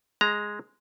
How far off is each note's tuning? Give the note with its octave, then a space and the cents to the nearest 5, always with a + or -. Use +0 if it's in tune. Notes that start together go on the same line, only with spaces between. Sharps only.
G#3 +0 A#5 +0